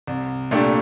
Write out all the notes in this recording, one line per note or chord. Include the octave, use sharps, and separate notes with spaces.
C2
A#2 A3 D4 G4